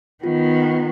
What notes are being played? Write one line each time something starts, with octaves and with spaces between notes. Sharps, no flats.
D#3 B3 F4